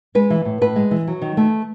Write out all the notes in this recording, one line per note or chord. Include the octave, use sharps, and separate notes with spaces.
G#3 B4
E3
A2
A2 B4
G#3
E3
F#3
D#3
A3